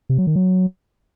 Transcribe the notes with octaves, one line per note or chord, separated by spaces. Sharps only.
C3
F#3
D#3
F#3